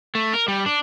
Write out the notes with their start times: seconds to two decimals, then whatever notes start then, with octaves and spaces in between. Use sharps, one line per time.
0.15 A3
0.34 A#4
0.48 G3
0.66 D4